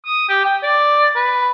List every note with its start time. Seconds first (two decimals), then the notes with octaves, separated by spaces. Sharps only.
0.05 D#6
0.29 G4
0.44 G5
0.63 D5
1.15 B4